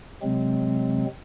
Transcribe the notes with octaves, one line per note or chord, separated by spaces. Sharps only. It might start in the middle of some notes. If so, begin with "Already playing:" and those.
C3 F#3 G#3 C4